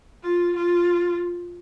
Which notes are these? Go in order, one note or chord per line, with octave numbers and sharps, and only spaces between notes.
F4
F4